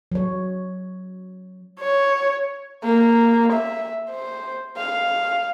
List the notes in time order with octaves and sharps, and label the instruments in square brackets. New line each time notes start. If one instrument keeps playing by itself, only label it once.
[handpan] F#3 C#5
[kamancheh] C#5
[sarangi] A#3
E5
C5
F5